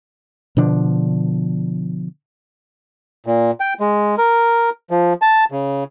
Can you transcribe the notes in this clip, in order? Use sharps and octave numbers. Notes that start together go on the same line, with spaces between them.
B2 D3 F3 D4
A#2
G5
G#3
A#4
F3
A5
C#3